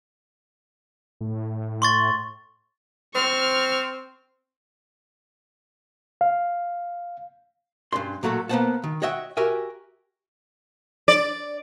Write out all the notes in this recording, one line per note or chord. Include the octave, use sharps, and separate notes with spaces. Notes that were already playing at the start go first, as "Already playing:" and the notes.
A2
C6 C#6 A6
C4 C#6 F6
F5
G2 C#4 D5 C6
A#2 F#3 A3 F#4 A4
A#3 B3 B4 C5 F#5 A5
D#3
F#4 C#5 D#5 E5 F#5 G5
F#4 G4 A#4 E5 G5 G#5
D5